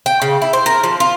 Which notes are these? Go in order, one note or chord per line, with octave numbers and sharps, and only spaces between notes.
G5
C#3
E4
C5
A#4
F3
F4